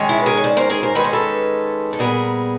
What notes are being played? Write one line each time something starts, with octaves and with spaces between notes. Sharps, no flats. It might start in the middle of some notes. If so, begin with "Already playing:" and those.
Already playing: D#3 G#3 C#4
E4
B4
G#4 A#4
C#5
C5 D5
A#4 C5
G#4 A#4
A#4 C5
D#3 G#3 C#4 B4
C5
A4 B4
A4
A#2 G3 B3 G#4 A#4